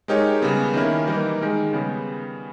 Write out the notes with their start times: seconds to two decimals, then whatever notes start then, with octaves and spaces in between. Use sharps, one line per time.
0.08 G#3 D#4 G4 A#4 C#5
0.42 C#3 G3 B3
0.74 D#3 A#3 C#4 E4 A#4
1.07 E3 G3 A#3 D#4 A#4
1.41 D#3 G#3 D#4 A#4
1.73 C#3 G3 B3